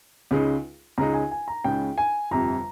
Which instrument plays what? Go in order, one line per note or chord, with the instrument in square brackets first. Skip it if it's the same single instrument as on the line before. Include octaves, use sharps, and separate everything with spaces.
[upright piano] C#2 C#3 G#3 D#4
[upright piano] C#2 C#3 G#3 D#4 [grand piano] A#5
[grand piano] G#5
G#5
A#5
[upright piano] C#2 C#3 G#3 D#4 [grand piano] G5
[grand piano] G#5
[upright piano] G1 F2 C3 G3 [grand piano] A#5